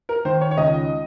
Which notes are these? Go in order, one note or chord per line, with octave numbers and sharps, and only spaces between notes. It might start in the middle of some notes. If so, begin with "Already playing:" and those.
A#4
D#3 C5
C#5
C#5
C#2 D#5